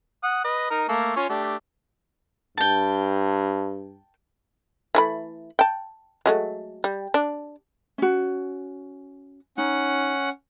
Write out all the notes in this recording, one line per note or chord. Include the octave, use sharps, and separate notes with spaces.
F#5 D#6
B4 D#5
D#4 A#4
A3 A#3 A4
C#4 F4 C#5
A3 D4 G4
G2 G5 A5
E3 A3 B5
G5 A5
F#3 G#3 A3
G3
D4
C#4 F#4
C#4 D#4 F#5